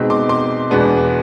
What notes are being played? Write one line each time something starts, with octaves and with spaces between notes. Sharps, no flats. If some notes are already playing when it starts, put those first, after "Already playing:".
Already playing: B2 G#3 C4 D#4
C6 D6
C6 D6
E2 B2 G#3 B3 D4